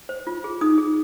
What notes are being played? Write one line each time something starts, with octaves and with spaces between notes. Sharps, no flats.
C5
F4
G#4
D#4 D#6
G#4